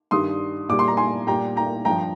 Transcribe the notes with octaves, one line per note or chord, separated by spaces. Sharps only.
G2 D#3 G3 C6 D#6
A#2 G3 D6
C6
A#5
G#5 C6
A#2 G3 G5 A#5
G5 A#5
G2 F3 G5 A#5